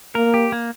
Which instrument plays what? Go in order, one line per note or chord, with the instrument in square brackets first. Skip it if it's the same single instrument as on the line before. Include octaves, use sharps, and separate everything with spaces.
[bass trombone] A#3 [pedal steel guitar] A#4
[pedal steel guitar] G4
A#3